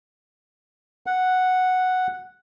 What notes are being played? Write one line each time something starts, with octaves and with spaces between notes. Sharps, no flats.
F#5